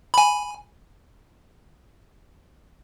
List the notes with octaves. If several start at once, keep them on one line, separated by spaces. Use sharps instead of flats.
G#5 B5